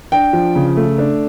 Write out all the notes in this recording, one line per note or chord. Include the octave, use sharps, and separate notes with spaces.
D4 G5
F3
C#3
A3
D4